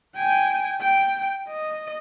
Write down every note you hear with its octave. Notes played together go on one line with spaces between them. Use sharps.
G5 G#5
G5
D#5